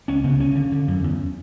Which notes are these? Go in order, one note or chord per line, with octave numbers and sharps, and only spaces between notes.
C#2 C#4
C#3 B3
D2 C#4
D3
D3
F#2
E2